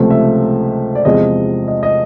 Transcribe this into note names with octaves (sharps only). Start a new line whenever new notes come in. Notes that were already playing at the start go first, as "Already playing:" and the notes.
Already playing: C#2 C3 F3 A3
E5
D5
E2 C3 F3 G#3 D#5
D#5
D#5